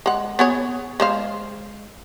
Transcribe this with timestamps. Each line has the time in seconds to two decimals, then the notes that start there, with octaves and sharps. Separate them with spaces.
0.06 G#3 F#5
0.39 B3 G#4 C#5
1.00 G#3 C5 F5